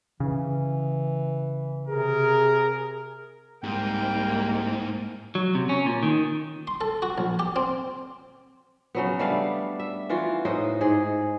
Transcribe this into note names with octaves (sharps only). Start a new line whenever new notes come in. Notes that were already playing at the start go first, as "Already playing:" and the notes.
C#3 E3
C3 G#4 A#4
C2 G#2 A#3 G5
F#3
C3
C#4
A#2
D#3
C6
A4
F#4
A#1
G4
C4
C#3 F#3 B3
G3 A3 D4 F5
E5
E3 F4 F#4
A2 D#4 C5 D#5
G#2 G#4